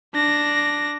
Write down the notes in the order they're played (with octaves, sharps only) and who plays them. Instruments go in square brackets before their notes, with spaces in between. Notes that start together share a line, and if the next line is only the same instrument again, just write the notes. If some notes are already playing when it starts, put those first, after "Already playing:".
[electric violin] D4 A#6